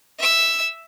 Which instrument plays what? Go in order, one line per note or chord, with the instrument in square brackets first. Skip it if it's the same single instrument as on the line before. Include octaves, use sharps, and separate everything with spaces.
[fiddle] E5 E6